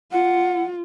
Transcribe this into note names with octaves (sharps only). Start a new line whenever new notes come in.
F4 F#5